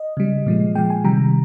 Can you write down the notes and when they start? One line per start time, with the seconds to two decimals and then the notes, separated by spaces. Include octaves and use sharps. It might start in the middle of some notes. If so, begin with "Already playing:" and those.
Already playing: D#5
0.17 C#3 G3
0.46 A#2 F3 G#3
0.75 A#2 F3 G#3 G5
0.90 G#5
1.04 C3 D#3 G3 A#5